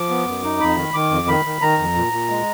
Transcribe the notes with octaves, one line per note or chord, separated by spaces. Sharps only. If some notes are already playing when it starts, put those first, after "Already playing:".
Already playing: F3 D6
B3
F#2
D#4
F2 B5
D#3
D#3 D6
F2
D#3 B5
D#3
D#3 A#5
F2
A#2
A#2
G#3